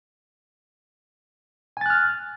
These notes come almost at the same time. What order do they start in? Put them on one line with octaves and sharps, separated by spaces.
G#5 A6 F#6 F6